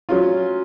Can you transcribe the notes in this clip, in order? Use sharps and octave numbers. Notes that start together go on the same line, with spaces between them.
F#3 C#4 F4